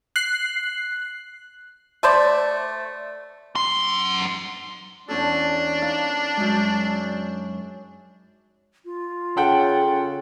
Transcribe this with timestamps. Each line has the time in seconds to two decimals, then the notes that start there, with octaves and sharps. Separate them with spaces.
0.16 F#6 C7
2.03 A3 C5 D5
3.55 F#2 C6
5.08 E2 C#4 D4 A4
5.82 D#4 A#4 F5
6.37 F#2 G#3
8.85 F4
9.37 C#3 A4 F#5 G5